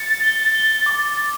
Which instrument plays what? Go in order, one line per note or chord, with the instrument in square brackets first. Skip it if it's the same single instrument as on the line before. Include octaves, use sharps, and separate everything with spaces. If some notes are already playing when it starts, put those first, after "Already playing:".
Already playing: [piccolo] A6 [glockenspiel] C#7
[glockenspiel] G7
G7
D6
D6